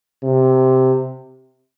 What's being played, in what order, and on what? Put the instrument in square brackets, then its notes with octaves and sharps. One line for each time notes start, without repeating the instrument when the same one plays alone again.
[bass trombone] C3